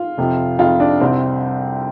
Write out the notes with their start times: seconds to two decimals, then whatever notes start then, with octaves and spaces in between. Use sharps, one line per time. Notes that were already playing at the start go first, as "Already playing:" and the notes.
Already playing: F4
0.18 F2 C3 F3
0.59 F2 C3 F3 F4
0.80 D4
1.01 C2 C3 G3 C4